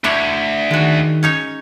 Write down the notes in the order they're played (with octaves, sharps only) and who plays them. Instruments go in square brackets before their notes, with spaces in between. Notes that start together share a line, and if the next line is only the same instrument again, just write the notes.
[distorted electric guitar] D2 [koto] D4 E4 C#5
[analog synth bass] D#3 [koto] G#3 F#4
[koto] C#4 D#4 C#5